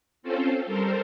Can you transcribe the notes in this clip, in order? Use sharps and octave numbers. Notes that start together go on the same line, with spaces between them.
C4 C#4 F4 A4 C5
G3 A4 A#4 C5